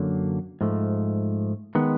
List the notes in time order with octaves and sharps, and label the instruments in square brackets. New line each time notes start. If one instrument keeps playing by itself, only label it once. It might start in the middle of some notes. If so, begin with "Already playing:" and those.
Already playing: [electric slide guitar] F#2 D3 F#3 A#3
G#2 F3 A3
D#3 G#3 B3